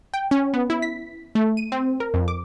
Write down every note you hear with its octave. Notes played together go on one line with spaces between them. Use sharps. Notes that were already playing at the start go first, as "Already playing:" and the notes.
G5
C#4
B3
E4
B6
A3
D#7
C4
A#4
F2
D6